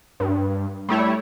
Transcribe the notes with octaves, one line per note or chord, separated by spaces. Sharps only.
G2
G3 A3 E4 C#5